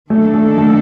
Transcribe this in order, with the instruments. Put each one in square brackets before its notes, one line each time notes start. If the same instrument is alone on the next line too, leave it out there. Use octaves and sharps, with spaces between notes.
[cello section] D#3 A#3 D4 A4 [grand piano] A3
[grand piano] A3
A3